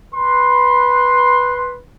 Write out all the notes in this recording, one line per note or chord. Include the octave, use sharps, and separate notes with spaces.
B4 C6